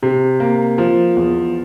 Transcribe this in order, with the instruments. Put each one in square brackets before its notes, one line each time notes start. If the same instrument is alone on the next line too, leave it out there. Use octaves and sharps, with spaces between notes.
[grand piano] C3
A#3
F3
E2